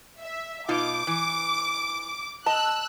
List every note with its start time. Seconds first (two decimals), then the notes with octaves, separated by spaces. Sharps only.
0.20 E5
0.69 B2 D#4 F4 D6
1.07 E3
2.46 D#5 A5 E6 F#6